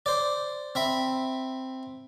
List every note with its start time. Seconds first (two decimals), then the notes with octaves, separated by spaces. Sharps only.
0.06 C5 D5
0.75 C4 E5 B5